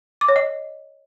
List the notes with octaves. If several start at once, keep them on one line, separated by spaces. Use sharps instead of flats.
D6
C#5
D#5